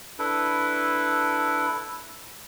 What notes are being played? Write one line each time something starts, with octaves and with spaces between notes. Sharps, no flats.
D4 E4 A4 B4